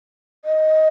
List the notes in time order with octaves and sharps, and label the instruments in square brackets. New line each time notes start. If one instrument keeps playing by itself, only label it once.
[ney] D#5